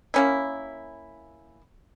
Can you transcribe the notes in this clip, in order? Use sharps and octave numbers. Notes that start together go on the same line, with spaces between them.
A#3 C#4 E4